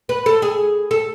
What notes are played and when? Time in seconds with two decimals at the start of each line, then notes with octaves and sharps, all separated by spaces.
0.09 B4
0.26 A4
0.42 G#4
0.91 A4